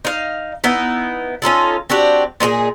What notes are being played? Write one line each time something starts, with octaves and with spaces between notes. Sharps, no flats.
D#4 F5
B3 D#4 E4
C#4 D#4 F4 A4
C4 D4 F#4 G4
A#2 D#4 F#4 G#4